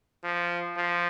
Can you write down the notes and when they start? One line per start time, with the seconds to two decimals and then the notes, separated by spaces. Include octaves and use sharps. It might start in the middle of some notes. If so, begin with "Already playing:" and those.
0.24 F3
0.77 F3